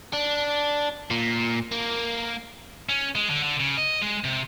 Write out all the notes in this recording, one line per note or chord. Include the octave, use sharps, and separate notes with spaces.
D4
A#2
A#3
C#4
G#3
D3
D3
C#3
D#5
G#3
C3